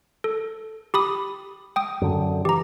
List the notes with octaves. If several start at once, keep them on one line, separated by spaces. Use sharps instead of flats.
A4
G4 B5 D#6
G5 D#6
F#2 D3
E3 G4 A#5